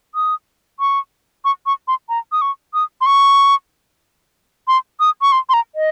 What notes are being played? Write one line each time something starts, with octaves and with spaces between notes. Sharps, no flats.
D#6
C#6
C#6
C#6
C6
A#5
D#6
C#6
D#6
C6
C#6
C6
D#6
C#6
C6
C6
A#5
D#5